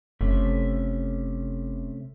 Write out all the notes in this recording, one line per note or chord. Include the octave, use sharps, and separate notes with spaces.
F#1 C3 A3 C#4